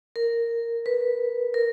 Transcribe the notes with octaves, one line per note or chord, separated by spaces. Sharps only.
A#4
B4
A#4